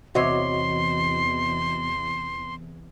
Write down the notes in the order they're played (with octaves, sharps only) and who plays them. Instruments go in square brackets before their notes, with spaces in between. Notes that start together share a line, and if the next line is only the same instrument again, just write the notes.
[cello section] E2 [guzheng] C3 C#5 [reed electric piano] F#4 D#5 [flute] C6